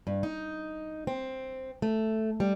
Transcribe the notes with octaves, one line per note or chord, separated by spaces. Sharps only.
G2
D#4
C4
A3
G3